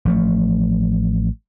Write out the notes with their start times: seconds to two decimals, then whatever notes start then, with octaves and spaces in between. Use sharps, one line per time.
0.05 A1 F3 A3